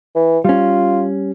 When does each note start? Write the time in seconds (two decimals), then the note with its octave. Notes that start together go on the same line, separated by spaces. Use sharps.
0.15 E3
0.45 G3 C#4 F4